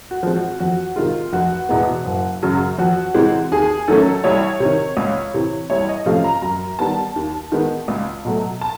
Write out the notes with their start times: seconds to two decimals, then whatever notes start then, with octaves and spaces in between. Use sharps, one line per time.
0.11 F#4
0.23 F3 G#3 C4
0.36 F#4
0.60 F2 F#4
0.96 C3 D#3 G#3 F4
1.33 F1 F#4
1.69 E2 B2 G#3 B3
2.06 F#1
2.43 F#2 C#3 F#3
2.78 F2 F#4
3.14 C3 E3 G#3 C4
3.52 D#2 G#4
3.88 D#3 F#3 A3 C#4 A4
4.24 C2 C#5
4.60 C3
4.65 D#3
4.97 C#2
5.34 C3 E3
5.70 C2 C#5
5.89 D#5
6.06 C3 F3 A3 C#4 F5
6.24 A#5
6.42 F#2 A#5
6.79 D#3 G3 B3 A5
7.16 D#2
7.52 D#3 G#3 B3
7.88 C#2
8.25 B2 F#3 A3
8.61 A5